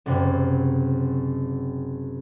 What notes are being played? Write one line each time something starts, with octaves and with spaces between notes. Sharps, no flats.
F#1 F#2 C3